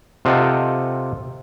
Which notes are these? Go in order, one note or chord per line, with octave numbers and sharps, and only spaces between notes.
C3 F4 A4 D#5 F#5 G5